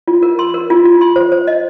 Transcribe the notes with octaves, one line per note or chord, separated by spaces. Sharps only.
F4
A#4
C6
A#4
F4
F4
C6
C5
C5
D#5